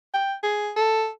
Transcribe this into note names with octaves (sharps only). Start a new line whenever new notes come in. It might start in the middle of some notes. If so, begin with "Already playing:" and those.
G5
G#4
A4